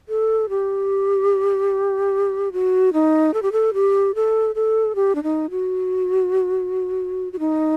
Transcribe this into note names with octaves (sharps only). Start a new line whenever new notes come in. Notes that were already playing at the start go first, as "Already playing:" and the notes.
A4
G4
F#4
D#4
A4
G4
A4
G4
A4
A4
G4
D4
D#4
F#4
F#4
D#4